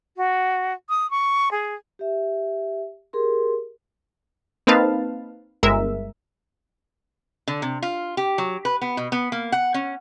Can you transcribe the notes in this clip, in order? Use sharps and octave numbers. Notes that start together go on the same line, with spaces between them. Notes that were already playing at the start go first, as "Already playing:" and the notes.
F#4
D#6
C#6
G#4
G4 E5
G4 G#4 A#4 C6
A#3 C4 D#4 B4 F5 A5
G1 G#3 A#4 E5
D3
C3
F4
G4
F#3
B4
B3
B2
B3
A#3
F#5
C#4